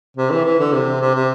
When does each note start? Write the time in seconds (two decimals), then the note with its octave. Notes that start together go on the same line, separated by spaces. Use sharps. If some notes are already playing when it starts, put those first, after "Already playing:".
0.17 C3
0.30 E3
0.45 E3
0.59 D3
0.73 C3
1.01 C3
1.15 C3